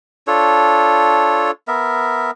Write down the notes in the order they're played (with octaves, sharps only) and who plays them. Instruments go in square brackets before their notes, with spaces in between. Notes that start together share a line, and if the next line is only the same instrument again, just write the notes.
[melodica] D4 F4 A4 C#5
B3 A#4 E5